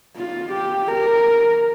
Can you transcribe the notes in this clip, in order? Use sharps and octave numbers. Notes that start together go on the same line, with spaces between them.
F4
G4
A#4